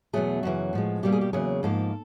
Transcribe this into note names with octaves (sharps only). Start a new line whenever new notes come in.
E2 B2 F#3 A3 G#4
F#2 C#3 E3 F#4
A2 F3 G#3
B2 G3 A#3 G4
G#4
G4
E2 C#3 F#3 A#3 G#4
G#2 F3 A#3 A4